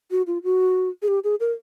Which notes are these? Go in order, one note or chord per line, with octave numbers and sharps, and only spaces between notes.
F#4
F4
F#4
G#4
G4
G#4
A#4